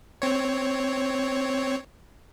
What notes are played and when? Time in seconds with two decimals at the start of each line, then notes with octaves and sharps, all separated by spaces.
0.22 C4 C#5